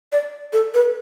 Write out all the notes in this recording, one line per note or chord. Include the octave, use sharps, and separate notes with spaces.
D5
A4
B4